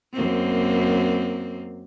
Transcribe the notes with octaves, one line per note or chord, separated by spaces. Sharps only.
F#2 A#3 C4